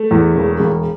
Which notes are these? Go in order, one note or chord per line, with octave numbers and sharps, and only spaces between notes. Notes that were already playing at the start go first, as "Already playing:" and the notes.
Already playing: A3
E2
E1
E1